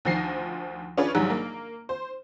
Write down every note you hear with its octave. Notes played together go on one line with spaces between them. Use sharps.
D2 D#3 F3 A#6 C7
C#4 D4 F4 G#4 B4 C#5
A#1 G#2 F#3 G3
A#3
C5